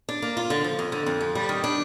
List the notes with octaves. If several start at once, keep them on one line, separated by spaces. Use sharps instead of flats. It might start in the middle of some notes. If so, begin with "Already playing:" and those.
D4
A#3
F4
D3
F3
F2
D3
F2
F3
G3
D#3
D4